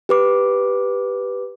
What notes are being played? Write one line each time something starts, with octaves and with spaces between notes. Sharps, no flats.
G4 B4 D6